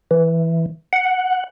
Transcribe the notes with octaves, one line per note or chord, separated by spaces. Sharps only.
E3
F#5